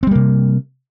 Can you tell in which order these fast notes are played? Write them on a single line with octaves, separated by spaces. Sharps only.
C4 G3 A#3 C3